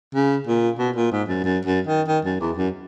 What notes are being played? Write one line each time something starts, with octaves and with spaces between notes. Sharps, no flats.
C#3
A#2
B2
A#2
G#2
F#2
F#2
F#2
D#3
D#3
F#2
E2
F#2